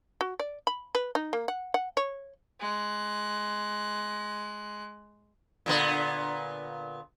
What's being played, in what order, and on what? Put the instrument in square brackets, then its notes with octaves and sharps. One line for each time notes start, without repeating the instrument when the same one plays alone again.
[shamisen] F#4
D5
B5
B4
D#4
A#3
F#5
F#5
C#5
[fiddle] G#3 F#6
[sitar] A#2 D3 B3